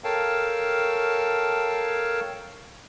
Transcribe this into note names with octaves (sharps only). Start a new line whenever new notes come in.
A4 A#4 C#5 F5 G5 A5